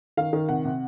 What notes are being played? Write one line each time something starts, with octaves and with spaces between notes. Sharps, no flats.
D#3 F5
D#3
C3 F#5
C3